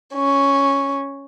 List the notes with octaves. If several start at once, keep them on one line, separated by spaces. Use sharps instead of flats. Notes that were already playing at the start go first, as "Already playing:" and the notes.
C#4